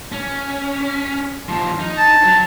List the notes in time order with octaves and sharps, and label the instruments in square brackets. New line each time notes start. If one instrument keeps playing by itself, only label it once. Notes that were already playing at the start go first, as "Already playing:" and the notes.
[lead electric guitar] C#4
D#2 F3
D#4
[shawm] A5
[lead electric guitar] F#3